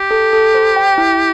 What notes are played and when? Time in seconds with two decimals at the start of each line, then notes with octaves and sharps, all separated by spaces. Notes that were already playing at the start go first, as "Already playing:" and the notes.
Already playing: G4
0.11 A4
0.33 A4
0.54 C5
0.76 G5
0.98 E4